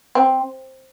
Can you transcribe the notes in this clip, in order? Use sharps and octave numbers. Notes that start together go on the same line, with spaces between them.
C4